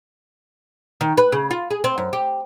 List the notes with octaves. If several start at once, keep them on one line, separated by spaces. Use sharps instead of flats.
D#3
B4
C#3
F4
G#4
C4
F#2
G4